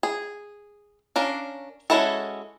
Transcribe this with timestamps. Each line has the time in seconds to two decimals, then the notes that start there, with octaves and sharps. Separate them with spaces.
0.03 G#4
1.16 C#4 D4 A#4 F5
1.90 G#3 C#4 E4 F#4 A4